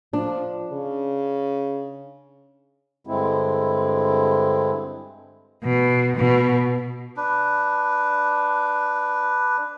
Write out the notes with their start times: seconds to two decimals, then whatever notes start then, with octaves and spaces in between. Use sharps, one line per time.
0.13 F3 D4
0.72 C#3
3.07 G2 D3 G#3 C4 E4
5.63 B2
6.15 B2
7.17 D4 B4